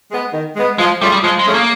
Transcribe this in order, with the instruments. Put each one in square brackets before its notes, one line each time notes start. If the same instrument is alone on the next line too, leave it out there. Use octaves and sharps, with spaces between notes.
[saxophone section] G#3 B3
D#3
G#3 B3
[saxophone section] F3 [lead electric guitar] G#3
[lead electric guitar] G3 [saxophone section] A3 C#4 F4 G#4
[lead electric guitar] G3
[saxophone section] F3 [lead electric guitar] G#3
[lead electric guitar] G#3
[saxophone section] A3 C#4 F4 G#4
[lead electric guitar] A#3